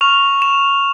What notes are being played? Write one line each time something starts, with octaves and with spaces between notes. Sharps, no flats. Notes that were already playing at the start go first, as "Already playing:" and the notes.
C#6 F6 F7
E7